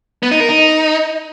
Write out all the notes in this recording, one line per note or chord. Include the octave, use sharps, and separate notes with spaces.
B3
D#4
A#4
D#4